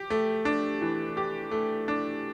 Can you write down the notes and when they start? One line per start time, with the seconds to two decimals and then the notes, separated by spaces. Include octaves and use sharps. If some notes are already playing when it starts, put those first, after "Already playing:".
Already playing: G4
0.10 A3
0.45 D4
0.81 E3
1.17 G4
1.51 A3
1.88 D4